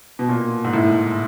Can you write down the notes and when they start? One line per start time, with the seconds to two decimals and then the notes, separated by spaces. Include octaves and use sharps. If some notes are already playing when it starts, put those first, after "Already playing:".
0.19 B2
0.29 A#2
0.64 G#2
0.73 A2